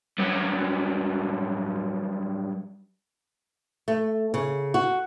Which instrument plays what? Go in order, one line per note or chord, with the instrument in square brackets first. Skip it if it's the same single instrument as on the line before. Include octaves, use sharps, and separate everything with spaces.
[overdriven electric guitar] G2 F#3
[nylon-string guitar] A3
C#3
F#4